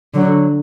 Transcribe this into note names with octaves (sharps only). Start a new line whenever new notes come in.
D3 F#3